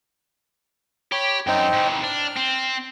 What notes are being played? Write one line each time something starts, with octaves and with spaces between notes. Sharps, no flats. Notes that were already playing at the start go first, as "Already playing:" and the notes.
G4 C#5 B5
F#2 C4 D#4 G5
G#2 E3
D4 F6
C4